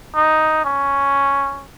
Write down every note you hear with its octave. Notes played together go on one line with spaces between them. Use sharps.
D#4
C#4